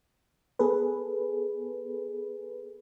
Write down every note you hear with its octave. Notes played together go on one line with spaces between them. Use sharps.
B3 G#4 A4 B4